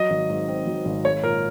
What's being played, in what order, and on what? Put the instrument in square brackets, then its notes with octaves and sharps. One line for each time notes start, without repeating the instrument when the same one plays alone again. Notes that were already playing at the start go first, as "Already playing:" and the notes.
Already playing: [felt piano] F#3 [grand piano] D#5
[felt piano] G#1
G#2
C4
F#3
G#1
[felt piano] G#3 [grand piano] C#5
[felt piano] A#2 [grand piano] A#4